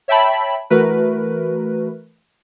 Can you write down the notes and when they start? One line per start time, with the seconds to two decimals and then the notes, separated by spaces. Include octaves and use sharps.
0.08 C#5 E5 G5 A5 B5
0.70 E3 A3 F#4 A#4 B4